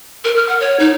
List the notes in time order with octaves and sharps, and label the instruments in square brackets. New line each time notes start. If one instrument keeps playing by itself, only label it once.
[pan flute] A#4
F6
F#5
C#5
D#4